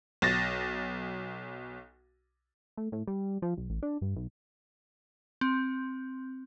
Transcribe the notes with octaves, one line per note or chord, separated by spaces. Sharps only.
B1 A6 A#6
A3
A2
G3
F3
B1
A1
D4
G2
B1
C4